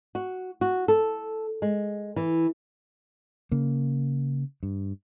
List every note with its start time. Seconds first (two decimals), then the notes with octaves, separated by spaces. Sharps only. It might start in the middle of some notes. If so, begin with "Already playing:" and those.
0.15 F#4
0.61 F#4
0.88 A4
1.62 G#3
2.16 E3
3.52 C#3 A#3
4.63 G2